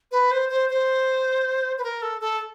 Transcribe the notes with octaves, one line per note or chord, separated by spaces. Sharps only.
B4
C5
C5
C5
B4
A#4
A4
A4